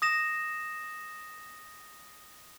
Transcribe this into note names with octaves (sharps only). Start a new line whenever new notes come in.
D#6 A#6 E7